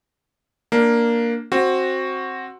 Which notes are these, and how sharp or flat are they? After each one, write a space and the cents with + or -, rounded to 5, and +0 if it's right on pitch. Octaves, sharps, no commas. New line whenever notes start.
A#3 +0 D4 +0
C4 +15 F#4 +0